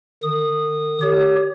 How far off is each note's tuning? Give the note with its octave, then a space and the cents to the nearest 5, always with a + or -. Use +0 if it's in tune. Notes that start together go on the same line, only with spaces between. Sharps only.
D#3 -45 D#6 -15
G4 -5 C#5 +25